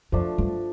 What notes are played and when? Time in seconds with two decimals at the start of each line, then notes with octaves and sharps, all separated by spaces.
0.12 F2 F3 A3 D4
0.38 G2